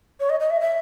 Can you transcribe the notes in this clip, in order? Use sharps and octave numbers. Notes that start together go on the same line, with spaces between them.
C#5
D#5
D#5
E5
E5